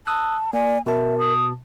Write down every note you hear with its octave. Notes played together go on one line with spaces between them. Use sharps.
A5 D#6 E6 F#6
A#3 D5 G#5
B2 A#4 E5 A5
D#6